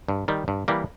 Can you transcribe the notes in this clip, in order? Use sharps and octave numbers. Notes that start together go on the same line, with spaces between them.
G2
D#3 G3
G2
E3 G3 A#3